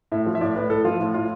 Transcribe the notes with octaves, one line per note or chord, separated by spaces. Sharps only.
A2 E5
F3
E5
A2 D5
A2 B4
A2 A4
F3 F4
A2
A2 F4